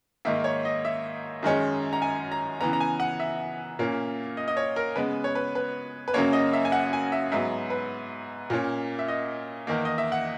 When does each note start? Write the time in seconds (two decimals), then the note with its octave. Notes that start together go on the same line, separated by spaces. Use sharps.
0.25 G#2 D#3 A#3 E5
0.44 C#5
0.65 D#5
0.85 E5
1.43 F#2 D#3 G#3 C#4
1.93 A#5
2.02 G#5
2.32 A#5
2.61 C#3 E3 B3 A#5
2.73 A#5
2.80 G#5
3.00 F#5
3.20 E5
3.79 A#2 A#3 C#4
4.37 D#5
4.48 D#5
4.57 C#5
4.76 A#4
4.96 C#3 G#3 B3 B4
5.24 C#5
5.35 B4
5.55 B4
6.08 B4
6.14 F#2 C#3 F#3 A#3 C#4 C#5
6.33 D#5
6.53 E5
6.65 G#5
6.72 F#5
6.93 G#5
7.12 E5
7.32 G#2 F#3 B3 E5
7.70 B4
8.50 A#2 A#3 C#4
8.99 E5
9.08 D#5
9.67 E2 D#3 A#3
9.85 D#5
9.98 E5
10.12 F#5